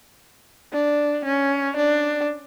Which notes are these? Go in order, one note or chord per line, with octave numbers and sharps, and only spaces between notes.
D4
C#4
D4